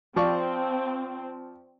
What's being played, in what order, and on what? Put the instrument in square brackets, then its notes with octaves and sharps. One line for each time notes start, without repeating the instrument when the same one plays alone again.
[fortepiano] F3 D5 C#6 [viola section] C4